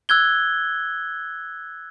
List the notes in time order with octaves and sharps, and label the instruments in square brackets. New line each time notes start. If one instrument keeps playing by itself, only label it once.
[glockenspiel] E6 F#6 G#6 G7